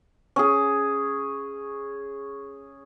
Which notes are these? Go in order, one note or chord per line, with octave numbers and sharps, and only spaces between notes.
C#4 G#4